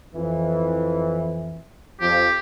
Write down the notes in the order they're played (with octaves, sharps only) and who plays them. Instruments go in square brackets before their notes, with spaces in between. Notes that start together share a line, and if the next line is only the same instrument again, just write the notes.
[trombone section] F2 E3
[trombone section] F2 F3 [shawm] G4